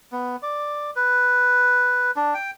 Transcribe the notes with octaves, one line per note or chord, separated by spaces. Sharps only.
B3
D5
B4
D4
G5